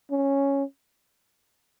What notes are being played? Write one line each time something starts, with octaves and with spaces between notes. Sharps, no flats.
C#4